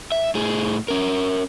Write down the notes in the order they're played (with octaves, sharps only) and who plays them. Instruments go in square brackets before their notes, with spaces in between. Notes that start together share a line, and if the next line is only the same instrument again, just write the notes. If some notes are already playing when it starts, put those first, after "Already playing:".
[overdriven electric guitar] E5
A2 G#4
C#4 A#4